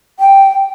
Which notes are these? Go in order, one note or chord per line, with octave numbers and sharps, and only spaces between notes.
G5